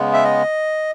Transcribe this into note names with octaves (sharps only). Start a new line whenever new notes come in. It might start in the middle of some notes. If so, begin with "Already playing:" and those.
Already playing: C#3 G#3 B3
E5
D#5